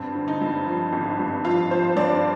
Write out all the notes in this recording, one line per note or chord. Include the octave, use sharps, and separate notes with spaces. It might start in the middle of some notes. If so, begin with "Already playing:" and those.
Already playing: G2 C4
D3
D#4
G2
F3
G#1
G2
F3 F4
F3 C5
G2 D5